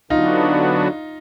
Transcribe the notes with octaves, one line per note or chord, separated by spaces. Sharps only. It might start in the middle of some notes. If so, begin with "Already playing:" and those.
D3 F#3 B3 D4 D#4 F4 F#4